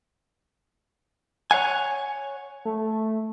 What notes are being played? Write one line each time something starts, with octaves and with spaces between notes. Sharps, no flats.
C#5 F5 F#5 G#5
A3